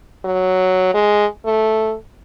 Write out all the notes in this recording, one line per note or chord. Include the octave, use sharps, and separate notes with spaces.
F#3
G#3
A3